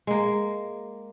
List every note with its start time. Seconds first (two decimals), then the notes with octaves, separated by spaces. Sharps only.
0.07 G#3 A#3